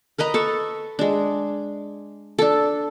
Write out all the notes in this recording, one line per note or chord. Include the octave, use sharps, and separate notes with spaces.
A#4 B4 D#5 A#5
A4 A5 C#6
G#3 D4
D4 A4